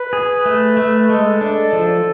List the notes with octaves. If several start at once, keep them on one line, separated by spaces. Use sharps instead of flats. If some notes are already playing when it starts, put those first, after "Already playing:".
Already playing: B4
G#4
A3
A3
G#3 A4
D4
F3